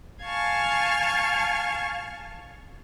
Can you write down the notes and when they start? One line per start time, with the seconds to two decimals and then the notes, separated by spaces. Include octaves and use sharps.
0.23 F5 G#5 A5 C#6 F6